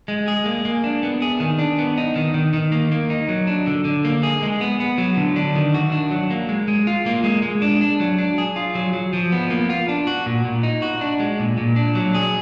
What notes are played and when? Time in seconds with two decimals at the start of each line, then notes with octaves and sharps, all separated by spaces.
0.08 G#3
0.28 G#4
0.46 A#3
0.65 A#3
0.84 D4
1.03 B3
1.22 G#4
1.40 D#3
1.59 D4
1.78 B3
1.97 D#4
2.16 D#3
2.34 D#3
2.53 D#3
2.72 A#3
2.91 A#3
3.10 D#4
3.29 F#3
3.47 D4
3.67 D3
3.85 D3
4.05 A#3
4.23 G#4
4.42 G#3
4.61 B3
4.80 B3
4.98 F#3
5.17 D3
5.36 D4
5.55 D#3
5.74 F#4
5.92 D4
6.11 F#3
6.30 A#3
6.49 G#3
6.68 G#3
6.87 F4
7.06 A#3
7.24 G#3
7.43 G#3
7.62 D4
7.81 D4
8.00 F#3
8.18 D4
8.38 G#4
8.56 F4
8.75 F#3
8.93 F#3
9.13 F3
9.32 B3
9.50 A#3
9.70 F4
9.88 D4
10.07 F#4
10.26 A#2
10.45 A#2
10.63 D#4
10.82 F#4
11.01 D4
11.20 G#3
11.39 A#2
11.58 A#2
11.76 D4
11.95 F#3
12.15 G#4